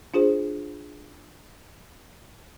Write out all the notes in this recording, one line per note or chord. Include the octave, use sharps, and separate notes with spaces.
D4 F4 G#4 C5